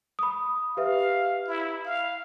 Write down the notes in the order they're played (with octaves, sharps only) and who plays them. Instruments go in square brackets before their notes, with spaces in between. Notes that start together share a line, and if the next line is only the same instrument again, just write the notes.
[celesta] B5 D#6
[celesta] G4 B4 E5 [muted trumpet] F5
[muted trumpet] E4
F5